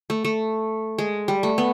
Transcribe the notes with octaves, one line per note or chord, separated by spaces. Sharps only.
A3
A3
G#3
G3
A3
B3